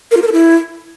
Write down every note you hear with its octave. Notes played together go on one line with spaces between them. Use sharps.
A#4
F4
A#4
A4
E4